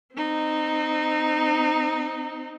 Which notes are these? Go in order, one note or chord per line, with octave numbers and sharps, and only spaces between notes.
C4 D#4